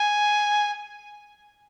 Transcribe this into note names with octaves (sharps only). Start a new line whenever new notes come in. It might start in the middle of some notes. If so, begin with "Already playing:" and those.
Already playing: G#5